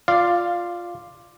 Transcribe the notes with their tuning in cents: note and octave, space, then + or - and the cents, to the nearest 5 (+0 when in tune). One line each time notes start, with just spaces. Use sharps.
F4 +0 D5 +5 F5 -10